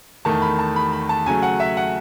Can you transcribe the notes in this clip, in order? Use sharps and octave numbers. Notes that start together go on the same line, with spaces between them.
E2 D#3 A3 A5
B5
A5
B5
B5
A5
C#3 F#3 A3 G#5
F#5
E5
F#5